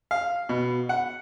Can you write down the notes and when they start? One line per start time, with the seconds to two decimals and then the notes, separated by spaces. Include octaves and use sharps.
0.11 F5
0.49 B2
0.89 F#5